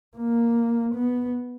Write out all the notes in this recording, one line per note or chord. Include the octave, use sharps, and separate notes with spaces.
A#3
B3